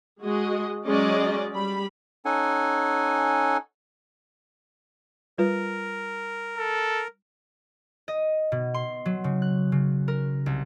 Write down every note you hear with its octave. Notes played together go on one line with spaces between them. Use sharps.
G#3 F#4 G#4 D#5
F#3 G#3 C#4 G#4 D5 D#5
G3 B5
C#4 D#4 A4 F#5 G#5
G3 F4 A#4 B4
A4
D#5
B2
C6
F#3
C#3
F#6
C#3
A#4
C2